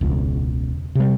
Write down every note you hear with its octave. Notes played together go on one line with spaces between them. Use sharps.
E1 C#2
C3 G3